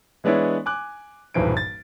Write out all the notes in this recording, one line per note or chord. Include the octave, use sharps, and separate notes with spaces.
E3 G#3 B3 D4 E4 C#5
G#5 D6 F#6
D#1 B1 G2 E3 C5 D7
A6